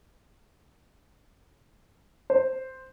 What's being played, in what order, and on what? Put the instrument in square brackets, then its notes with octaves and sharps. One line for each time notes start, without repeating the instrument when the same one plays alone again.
[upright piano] C5